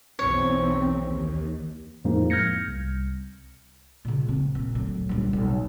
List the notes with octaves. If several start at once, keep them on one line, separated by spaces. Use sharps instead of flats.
B1 E2 C4 C#5
D#2
F2 A2 F3 G#3 A#3 D#4
F6 G6 G#6 A#6 C#7
C2
A#2 C#3
C4
A#2
D2 F#3
A#1 G3
B1